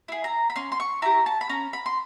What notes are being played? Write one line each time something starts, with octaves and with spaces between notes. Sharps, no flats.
E4 G#4
A#5
B5
C#4 C6
C6
C#6
E4 G4 A#5
A5
B5
C#4 A#5
B5
C6